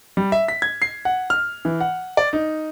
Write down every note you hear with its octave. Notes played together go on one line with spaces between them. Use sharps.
G3
E5
B6
G#6
C7
F#5
F6
E3
F#5
D5
D#4